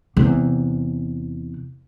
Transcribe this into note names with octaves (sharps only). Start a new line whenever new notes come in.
E2 C3